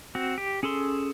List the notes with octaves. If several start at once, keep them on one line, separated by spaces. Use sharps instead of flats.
C4 F#4
G4
C#4 G#4 A4 C6